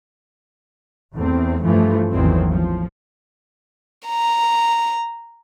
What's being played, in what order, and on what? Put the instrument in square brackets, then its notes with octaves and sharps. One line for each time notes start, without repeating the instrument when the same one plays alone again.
[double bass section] E2 A3 C4
G2 E3 F3 A3
A1 E2 D#3 E3 F#3 C4
F3
[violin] A#5